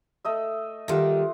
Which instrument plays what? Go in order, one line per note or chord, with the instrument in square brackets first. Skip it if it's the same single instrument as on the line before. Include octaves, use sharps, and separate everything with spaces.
[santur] A3 D#5 E5
[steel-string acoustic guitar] D#3 G3 [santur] A3 F4 F#5